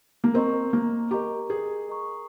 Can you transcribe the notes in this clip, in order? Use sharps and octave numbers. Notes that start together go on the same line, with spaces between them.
A#3
C4 A#4 D#5 A#5 C#6
A#3
G4 A#4 D#5 A#5 C#6
G#4
A#4 D#5 A#5 C#6